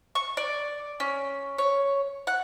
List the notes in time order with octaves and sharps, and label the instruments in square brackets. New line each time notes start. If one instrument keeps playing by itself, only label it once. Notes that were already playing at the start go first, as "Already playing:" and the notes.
[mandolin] C#6
D5
C#4
C#5
F#5